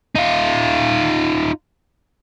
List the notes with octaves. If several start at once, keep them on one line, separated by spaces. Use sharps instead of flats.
D#4 F4